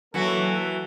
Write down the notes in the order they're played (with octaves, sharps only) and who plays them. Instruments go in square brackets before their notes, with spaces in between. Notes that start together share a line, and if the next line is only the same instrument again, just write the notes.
[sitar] E3 F#4 [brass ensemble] F#3 A#3 A4